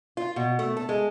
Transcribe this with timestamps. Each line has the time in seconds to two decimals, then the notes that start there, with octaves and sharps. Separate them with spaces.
0.17 F4
0.36 B2
0.59 A3
0.77 A4
0.89 G#3